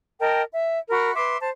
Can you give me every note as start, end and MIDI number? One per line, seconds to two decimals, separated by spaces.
0.20 0.42 70
0.20 0.42 75
0.20 0.42 79
0.20 0.42 81
0.52 0.79 76
0.90 1.13 66
0.90 1.13 70
0.90 1.13 83
1.15 1.37 71
1.15 1.37 76
1.15 1.37 84
1.15 1.37 86
1.40 1.50 72
1.40 1.50 81